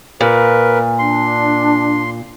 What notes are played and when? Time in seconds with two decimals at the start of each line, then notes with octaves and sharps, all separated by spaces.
0.21 A#2 A#4 B4
0.99 D4 C6